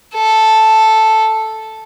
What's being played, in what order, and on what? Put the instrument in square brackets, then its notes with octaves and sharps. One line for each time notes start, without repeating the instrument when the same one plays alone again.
[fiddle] A4